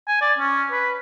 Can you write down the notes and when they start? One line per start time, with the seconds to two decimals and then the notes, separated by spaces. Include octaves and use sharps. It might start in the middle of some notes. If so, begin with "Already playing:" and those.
0.08 G#5
0.22 D5
0.38 C#4
0.71 B4